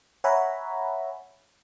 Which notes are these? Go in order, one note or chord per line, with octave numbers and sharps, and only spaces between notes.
C#5 E5 F#5 G#5 A#5 B5